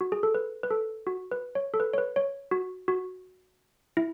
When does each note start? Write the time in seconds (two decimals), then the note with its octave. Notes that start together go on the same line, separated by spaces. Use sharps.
0.01 F#4
0.12 G#4
0.23 A4
0.35 B4
0.63 B4
0.71 A4
1.07 F#4
1.31 B4
1.55 C#5
1.74 A4
1.80 B4
1.93 C#5
1.98 B4
2.16 C#5
2.51 F#4
2.88 F#4
3.97 E4